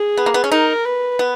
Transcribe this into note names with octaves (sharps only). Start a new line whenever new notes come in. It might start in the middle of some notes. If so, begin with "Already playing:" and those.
Already playing: G#4
B3
A#3
B3
C#4
D#4 A#4
B4
B3